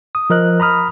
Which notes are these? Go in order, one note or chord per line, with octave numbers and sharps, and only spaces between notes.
D#6
F3 A#4 D#5 F#6
A#5 B5 D#6 F6